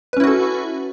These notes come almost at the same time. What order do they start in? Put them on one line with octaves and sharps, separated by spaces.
B4 C#4 E4 F#4 A4